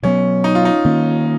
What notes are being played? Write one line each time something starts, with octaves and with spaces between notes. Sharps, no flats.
B2 F#3 B3 C#4
D#4
F4
D#4
D#3 A#3 C#4